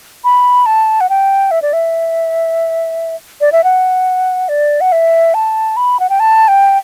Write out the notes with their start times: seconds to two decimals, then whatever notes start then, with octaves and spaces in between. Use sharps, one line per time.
0.24 B5
0.66 A5
1.01 F#5
1.09 G5
1.51 E5
1.62 D5
1.73 E5
3.41 D5
3.52 E5
3.64 F#5
4.49 D5
4.81 F#5
4.92 E5
5.34 A5
5.77 B5
6.00 F#5
6.10 G5
6.20 A5
6.48 G5